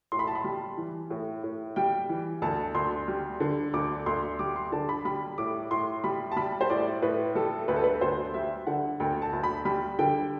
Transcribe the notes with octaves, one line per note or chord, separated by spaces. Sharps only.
A2 C6
B5
A5
B5
G3
E3
A2
A2
G3 G5
E3
D2 A5
D2 C6
G3
D3
D2 D6
D2 C6
G3 D6
C6
D3 A5
B5
G3 B5
A2 D6
A2 C6
G3 B5
A5
G3 B5
C5
A2 D5
A2 B4
G3 A4
D2 B4
A4
B4
D2 C5
G3 E5
D3 F#5
D2 G5
A5
D2
B5
G3 B5
D3 G5